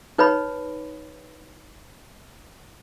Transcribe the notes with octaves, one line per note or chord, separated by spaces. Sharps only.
D#4 B4 C#5 B5